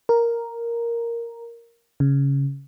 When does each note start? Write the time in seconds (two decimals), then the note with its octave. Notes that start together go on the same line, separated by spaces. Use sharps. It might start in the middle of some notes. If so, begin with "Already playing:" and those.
0.09 A#4
2.00 C#3